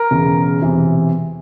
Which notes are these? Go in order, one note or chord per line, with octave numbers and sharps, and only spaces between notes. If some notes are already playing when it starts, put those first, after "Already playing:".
Already playing: A#4
E1 E2 C#3
E1 E2 C3 E3